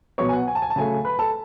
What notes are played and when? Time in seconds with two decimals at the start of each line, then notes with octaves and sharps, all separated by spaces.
0.18 B2 F#3 B3 C#5 C#6
0.29 G#5
0.33 F#5
0.47 G#5
0.55 A5
0.62 G#5
0.70 A5
0.76 C#3 F#3 A3 G#5
1.05 B4 B5
1.19 A4 A5